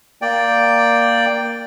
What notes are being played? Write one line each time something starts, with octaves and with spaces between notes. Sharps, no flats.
A#3 D5 G5